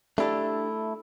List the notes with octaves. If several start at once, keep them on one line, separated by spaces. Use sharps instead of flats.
A3 D4 E4 G4 A4